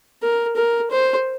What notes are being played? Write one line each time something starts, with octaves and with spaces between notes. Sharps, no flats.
A#4
A#4
C5